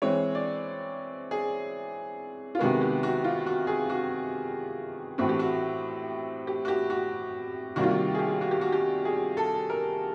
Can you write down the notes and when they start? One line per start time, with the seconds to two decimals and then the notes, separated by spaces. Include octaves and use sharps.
0.02 E3 G#3 C4 C#5
0.35 D5
1.31 G#4
2.55 F4
2.59 C3 D#3 G#3 B3 F#4
2.81 G4
3.03 F#4
3.24 F4
3.46 F#4
3.67 G#4
3.90 F#4
5.18 A2 E3 A3 C4 F#4
5.29 G4
5.39 F#4
6.47 G4
6.65 F#4
6.68 G4
6.90 F#4
7.76 C3 D#3 G3 A#3 F#4
7.83 F4
7.91 F#4
8.14 G#4
8.19 G4
8.41 F#4
8.51 G4
8.61 F#4
8.72 G4
9.05 G#4
9.37 A4
9.70 A#4